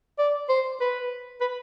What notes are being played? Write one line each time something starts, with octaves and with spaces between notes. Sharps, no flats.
D5
C5
B4
B4